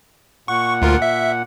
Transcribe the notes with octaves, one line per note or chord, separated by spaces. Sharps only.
A#2 F#5 C#6
D2 F4 A#4
E5